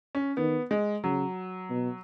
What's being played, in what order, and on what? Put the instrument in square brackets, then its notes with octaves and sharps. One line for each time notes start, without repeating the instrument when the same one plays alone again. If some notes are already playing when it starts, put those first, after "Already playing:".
[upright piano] C#4
[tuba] D#3 [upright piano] B3
[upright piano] G#3
[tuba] C#3 [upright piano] F#3
[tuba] B2